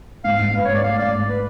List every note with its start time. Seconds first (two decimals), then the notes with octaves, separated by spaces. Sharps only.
0.24 G#2 F5
0.39 G#2
0.54 G#2 B4
0.65 C#5
0.69 G#2
0.74 D5
0.83 A3 F5
0.99 G#2 D5
1.13 G#2
1.28 B4